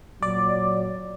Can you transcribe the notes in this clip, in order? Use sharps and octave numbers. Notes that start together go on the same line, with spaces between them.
A#2 F#3 D5